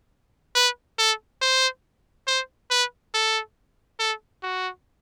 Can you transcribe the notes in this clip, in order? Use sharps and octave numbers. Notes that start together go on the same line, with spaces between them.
B4
A4
C5
C5
B4
A4
A4
F#4